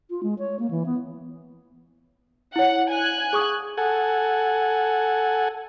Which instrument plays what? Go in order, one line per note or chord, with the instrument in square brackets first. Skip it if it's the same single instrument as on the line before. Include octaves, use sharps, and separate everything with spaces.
[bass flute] F4
G#3
C#5
A#3
E3
B3
[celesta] E4 C#5 [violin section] F#5
[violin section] G#5 F#6
[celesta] G#4 C#6 D#6
[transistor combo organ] A4 F#5 G#5